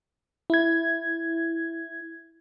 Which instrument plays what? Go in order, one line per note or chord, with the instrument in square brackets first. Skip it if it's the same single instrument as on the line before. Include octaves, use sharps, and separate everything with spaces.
[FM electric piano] E4 G#6